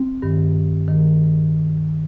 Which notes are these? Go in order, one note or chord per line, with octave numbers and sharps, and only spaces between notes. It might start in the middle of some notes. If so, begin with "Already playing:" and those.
Already playing: C4
G2 D#3
G2 D#3